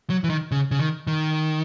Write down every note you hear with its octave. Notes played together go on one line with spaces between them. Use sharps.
F#3
E3
D#3
C#3
C#3
D#3
D#3